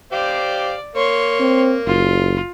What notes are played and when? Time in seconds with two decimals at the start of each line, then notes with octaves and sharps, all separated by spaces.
0.12 G4 C5 D5 F5
0.96 A#3 C#5 C6
1.40 C4
1.86 F#1 F4